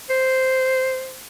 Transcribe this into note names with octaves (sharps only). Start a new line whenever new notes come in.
C5